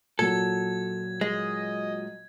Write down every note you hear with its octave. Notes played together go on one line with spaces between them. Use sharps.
A#2 F#3 A4 G#6
G#3 D#5